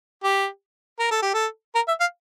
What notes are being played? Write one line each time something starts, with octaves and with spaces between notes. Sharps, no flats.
G4
A#4
A4
G4
A4
A#4
E5
F5